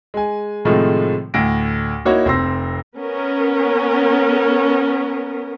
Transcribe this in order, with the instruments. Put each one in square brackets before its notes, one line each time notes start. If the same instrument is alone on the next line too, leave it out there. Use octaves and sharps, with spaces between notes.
[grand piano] G#3 G#5
A2 C3 D#3 F3 G#3 A3
D2 A2 A#6 D7
A#3 D#4 E4 F#4 C#5
F1 C4 C6 E6 A#6
[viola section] B3 C#4 A#4